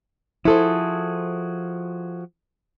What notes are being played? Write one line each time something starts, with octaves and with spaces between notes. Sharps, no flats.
F3 E4 F#4 G#4 A4 C5